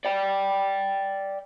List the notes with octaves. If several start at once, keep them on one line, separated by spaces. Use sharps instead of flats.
D5 G5